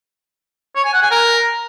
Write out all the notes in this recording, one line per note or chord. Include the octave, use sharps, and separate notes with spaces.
C#5
G#5
F#5
G#5
A#4